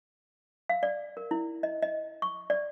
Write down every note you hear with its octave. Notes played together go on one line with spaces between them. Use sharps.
F5
D5
A#4
E4
D#5
D#5
C#6
D5